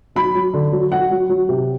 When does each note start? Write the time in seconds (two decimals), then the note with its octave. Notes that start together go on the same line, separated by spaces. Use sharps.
0.15 F#3 B5
0.35 F#3
0.54 D3
0.72 F#3
0.92 F#3 F#5
1.11 F#3
1.29 F#3
1.49 C3